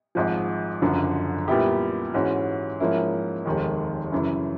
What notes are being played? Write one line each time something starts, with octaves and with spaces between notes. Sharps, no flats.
G#1 G#2 F3
F#1 F#2 D3 F3
A#2 G3 B3 E4 G4
G#2 E3 G#3 C#4 F#4
G#2 F3 A#3 C#4 E4
F1 D#2 D#3 G#3
F#2 C#3 E3